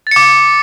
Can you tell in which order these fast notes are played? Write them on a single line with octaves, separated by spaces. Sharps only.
A6 C#7 D6